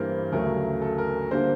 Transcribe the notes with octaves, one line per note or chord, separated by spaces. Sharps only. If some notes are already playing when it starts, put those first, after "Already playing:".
Already playing: G2 E3 G3 A#3 A#4 C5
D2 C#3 F#3 A3 A#4
A4
A#4
D3 G3 A#3 C5